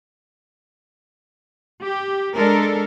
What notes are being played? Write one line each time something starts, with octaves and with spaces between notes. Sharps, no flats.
G4
G#3 D4 A4 A#4